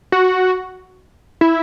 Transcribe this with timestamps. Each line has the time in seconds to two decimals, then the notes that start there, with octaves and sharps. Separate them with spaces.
0.12 F#4
1.41 E4